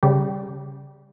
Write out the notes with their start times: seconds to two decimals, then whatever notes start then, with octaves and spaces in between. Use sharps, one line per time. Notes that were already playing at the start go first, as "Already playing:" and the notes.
0.03 C#3 G3